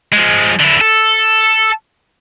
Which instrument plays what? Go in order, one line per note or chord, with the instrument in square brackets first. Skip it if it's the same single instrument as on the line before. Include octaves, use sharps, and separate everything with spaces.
[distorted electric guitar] F3 G#3
D3 E4
A4